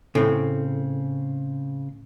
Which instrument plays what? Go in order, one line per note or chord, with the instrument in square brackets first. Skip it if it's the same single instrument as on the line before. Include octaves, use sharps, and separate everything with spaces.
[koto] A2 [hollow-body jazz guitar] C#3 C4